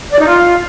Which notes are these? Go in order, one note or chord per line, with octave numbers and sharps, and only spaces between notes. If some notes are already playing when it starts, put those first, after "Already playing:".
D5
D#4
F4